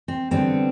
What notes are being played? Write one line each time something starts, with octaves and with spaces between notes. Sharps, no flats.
C4
D3 G3 B3 C4